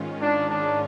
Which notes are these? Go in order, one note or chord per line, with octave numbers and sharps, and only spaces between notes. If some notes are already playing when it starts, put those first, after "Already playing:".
Already playing: G#2 D#3 G#3 C#4 F4
D4
D4